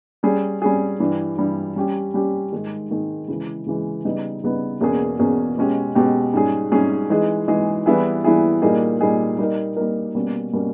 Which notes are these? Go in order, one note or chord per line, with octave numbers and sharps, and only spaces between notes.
G3 C#4 G#4
G3 C#4 G#4
G2 E3 G3
G2 E3 G3
G3 C#4 G4
G3 C#4 G4
G#2 D#3 G#3
G#2 D#3 G#3
C#3 E3 G#3
C#3 E3 G#3
C#3 G3 B3 D#4
C#3 G3 B3 D#4
E2 B2 A#3 C#4 G#4
E2 B2 A#3 C#4 G#4
B2 G#3 C#4 G4
B2 G#3 C#4 G4
G#2 G3 C#4 G#4
G#2 G3 C#4 G#4
E3 G#3 D#4 G#4
E3 G#3 D#4 G#4
E3 G3 B3 E4 G#4
E3 G3 B3 E4 G#4
A#2 G3 A#3 D#4 G#4
A#2 G3 A#3 D#4 G#4
G3 A#3 D#4 A#4
G3 A#3 D#4 A#4
B2 G3 A#3 C#4
B2 G3 A#3 C#4